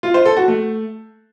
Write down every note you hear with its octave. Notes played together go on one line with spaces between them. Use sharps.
F4
C5
A4
F#4
A3